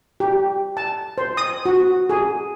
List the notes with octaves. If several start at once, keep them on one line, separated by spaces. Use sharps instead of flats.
G4
A5
C5
D#6
F#4
G#4